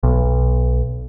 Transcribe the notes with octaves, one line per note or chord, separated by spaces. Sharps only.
B1